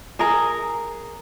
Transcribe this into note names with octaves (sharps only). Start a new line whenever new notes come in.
G#4 A#4 A#5